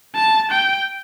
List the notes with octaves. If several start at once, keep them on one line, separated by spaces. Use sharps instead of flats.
A5
G5